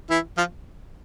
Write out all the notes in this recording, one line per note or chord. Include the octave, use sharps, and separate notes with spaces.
E3 E4
F3 F4